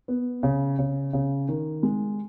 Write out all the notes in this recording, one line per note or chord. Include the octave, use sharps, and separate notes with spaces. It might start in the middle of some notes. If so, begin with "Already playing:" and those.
B3
C#3
C#3
C#3
D#3
G#3